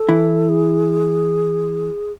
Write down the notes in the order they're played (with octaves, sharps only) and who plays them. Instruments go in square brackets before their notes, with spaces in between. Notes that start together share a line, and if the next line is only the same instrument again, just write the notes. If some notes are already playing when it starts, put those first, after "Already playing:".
Already playing: [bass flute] A4
[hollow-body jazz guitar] E3 E4
[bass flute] G#4